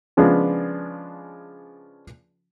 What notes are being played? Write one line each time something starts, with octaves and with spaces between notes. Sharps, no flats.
C#3 F3 G#3 B3 D4